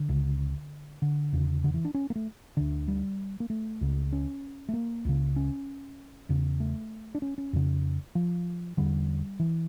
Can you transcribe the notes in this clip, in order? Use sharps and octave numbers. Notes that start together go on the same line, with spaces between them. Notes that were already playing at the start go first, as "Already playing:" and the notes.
Already playing: D3
C#2 C#3
D3
E2 C#3
D3
E3
D4
C#4
A#3
A3
D2 D3
G3
A#3
A3
C#2 C#3
C#4
A3
A#3
C#2 C#3
C#4
E2 C#3
A3
D4
C#4
C#4
F2 C#3
F3
E2 D3 G3
E3